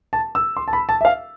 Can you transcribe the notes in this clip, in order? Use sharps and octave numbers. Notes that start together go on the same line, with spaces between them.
A5
E6
C6
A5
B5
A5
E5
F5